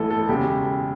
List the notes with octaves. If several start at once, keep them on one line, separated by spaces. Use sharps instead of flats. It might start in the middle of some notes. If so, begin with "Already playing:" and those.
Already playing: A1 A2 E3 A4
A4
E1 C#3 G4